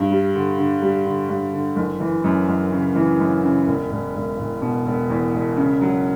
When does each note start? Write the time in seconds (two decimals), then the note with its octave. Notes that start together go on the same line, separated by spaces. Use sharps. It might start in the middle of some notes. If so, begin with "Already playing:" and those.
Already playing: G2
0.10 G3
0.34 D3
0.58 D3
0.82 G3
1.05 D3
1.29 G2
1.53 D3
1.76 F#1
2.00 E3
2.24 F#2
2.48 F#2
2.72 C#3
2.96 E3
3.20 F#2
3.44 C#3
3.67 E1
3.91 E1
4.15 E1
4.39 E1
4.62 B2
4.86 E1
5.10 E2
5.34 E1
5.57 C#3
5.81 F#3